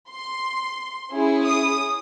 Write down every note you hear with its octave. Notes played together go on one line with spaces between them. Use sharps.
C6
C#4 E4 G#4
D#6